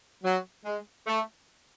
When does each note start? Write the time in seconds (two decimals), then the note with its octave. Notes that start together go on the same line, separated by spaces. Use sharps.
0.23 F#3
0.65 G#3
1.06 A3